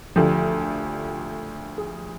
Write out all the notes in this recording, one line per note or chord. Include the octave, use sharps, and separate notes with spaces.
D2 D3 F3 G4
G#4